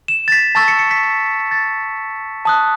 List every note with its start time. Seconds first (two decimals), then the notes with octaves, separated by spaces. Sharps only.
0.08 E7
0.28 A6
0.32 B6
0.55 A5 C#6 E6 A6
0.68 C#7
0.79 C#7
0.91 B6
1.51 A6
2.45 A5 D#6 F#6